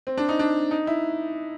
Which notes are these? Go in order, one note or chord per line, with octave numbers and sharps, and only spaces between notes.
C4
D4
D#4
D4
D#4
E4